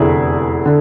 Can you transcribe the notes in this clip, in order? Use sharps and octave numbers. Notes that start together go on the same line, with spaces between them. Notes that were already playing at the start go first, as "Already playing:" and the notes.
Already playing: F1 E2 D3 E4 G#4
D3